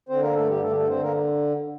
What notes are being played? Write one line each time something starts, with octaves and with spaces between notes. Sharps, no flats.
D3 C4 C5
A#3 A#4
G2 A3 A4
G3 G4
D3 A3 A4
G4
A3 A4
D3 C4 C5
A#3 A#4